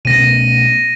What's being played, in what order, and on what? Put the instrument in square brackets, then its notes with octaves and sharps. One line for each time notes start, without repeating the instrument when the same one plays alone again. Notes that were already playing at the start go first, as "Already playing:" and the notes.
[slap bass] B2 A3 C#4 [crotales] A#6 D#7